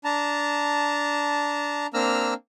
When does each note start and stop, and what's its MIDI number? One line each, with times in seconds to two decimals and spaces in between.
0.04 1.87 62
0.04 1.87 81
0.04 1.87 82
1.94 2.34 58
1.94 2.34 60
1.94 2.34 62
1.94 2.34 82
1.94 2.34 88
1.94 2.34 89